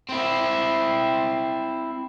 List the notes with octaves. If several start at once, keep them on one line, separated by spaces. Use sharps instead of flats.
C4 E4